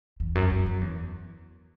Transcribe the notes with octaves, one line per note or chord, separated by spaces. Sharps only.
E2
F#2
F#2
F#2
E2